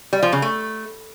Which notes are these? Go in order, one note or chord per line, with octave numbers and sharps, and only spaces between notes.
G3
F3
C#3
A3